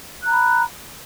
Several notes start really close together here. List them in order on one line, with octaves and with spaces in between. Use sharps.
F#6 A#5 B5